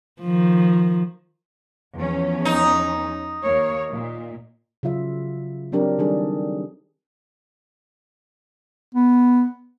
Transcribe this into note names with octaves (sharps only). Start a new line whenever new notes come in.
D#3 F3
E2 F3 C#4
D#4
D#2 A#3 C#5
A#2
C#3 F#3 F4 E5
F#3 C4 D4 G4 A#4
D#3 G3 D4 G#4 A4
B3